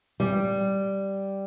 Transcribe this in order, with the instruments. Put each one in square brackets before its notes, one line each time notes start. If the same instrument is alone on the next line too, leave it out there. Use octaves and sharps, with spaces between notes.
[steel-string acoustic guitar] G3